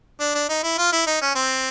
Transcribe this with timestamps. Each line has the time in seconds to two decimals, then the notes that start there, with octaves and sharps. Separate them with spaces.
0.20 D4
0.35 D4
0.49 D#4
0.63 E4
0.78 F4
0.92 E4
1.07 D#4
1.21 C#4
1.35 C4